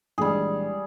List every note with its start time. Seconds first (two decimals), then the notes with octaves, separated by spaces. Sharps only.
0.18 A#1 E3 G3 G#3 G#4